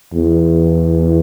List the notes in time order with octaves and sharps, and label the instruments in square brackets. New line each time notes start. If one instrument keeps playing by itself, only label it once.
[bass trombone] E2